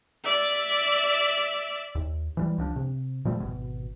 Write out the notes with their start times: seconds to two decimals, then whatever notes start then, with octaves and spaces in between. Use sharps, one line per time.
0.24 D5 E5
1.95 D#2
2.37 E3 F3 G3
2.58 C#2 F3 D4
2.76 C3
3.25 A#2 F3 G3 A3
3.40 G#1 G2 B2